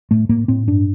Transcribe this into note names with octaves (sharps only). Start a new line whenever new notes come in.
A2 A3
A2 A#3
A2 C4
G2 D4